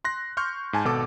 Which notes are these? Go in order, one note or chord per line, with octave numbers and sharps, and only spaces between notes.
C6 F#6 A#6
C6 C#6 F6 G6
G#2 G#5 A5
G#1 B2 A4 D6